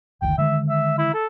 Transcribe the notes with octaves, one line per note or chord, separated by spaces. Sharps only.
F#1 D2 D#3 G5
D3 D#3 G#3 E5
E5
E4
A4